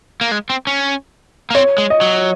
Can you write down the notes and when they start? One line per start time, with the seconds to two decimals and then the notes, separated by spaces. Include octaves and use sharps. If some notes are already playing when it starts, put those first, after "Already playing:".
0.21 A#3
0.31 G#3
0.50 C4
0.67 C#4
1.51 A#3
1.54 C4 C#5
1.78 G#3
1.90 D#5
2.01 F#3